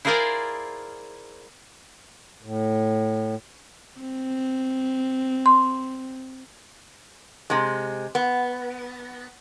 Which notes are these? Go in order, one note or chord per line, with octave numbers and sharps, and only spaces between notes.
E4 F4 G#4 A#4 C5 D5
A2
C4
C6
C3 G#3
B3